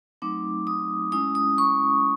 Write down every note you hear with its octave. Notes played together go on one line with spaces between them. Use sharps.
F#3 A3 C4 D#4 D6
D#6
G#3 C#4 E4 D#6
D#6
C#6